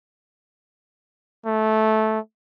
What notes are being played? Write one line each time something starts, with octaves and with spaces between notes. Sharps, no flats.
A3